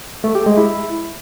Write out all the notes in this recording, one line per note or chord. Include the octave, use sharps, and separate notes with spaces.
A3
G4
G#3
E4